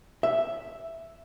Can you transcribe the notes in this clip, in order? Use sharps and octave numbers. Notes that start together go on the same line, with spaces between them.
E5